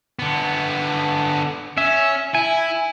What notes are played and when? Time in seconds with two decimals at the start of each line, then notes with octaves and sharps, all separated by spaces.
0.19 D3 B3
1.78 C#4 E5
2.35 E4 G#5